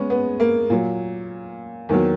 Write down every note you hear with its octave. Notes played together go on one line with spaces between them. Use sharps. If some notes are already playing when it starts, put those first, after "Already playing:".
Already playing: G#3 B3 C#4
B3
A#3
A#2 F#3
E2 D#3 F#3 A#3